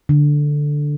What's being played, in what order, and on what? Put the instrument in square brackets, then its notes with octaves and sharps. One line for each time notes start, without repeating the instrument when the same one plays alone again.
[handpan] D3